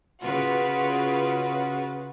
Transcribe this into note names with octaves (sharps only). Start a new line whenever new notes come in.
C#3 F4 F#4 B4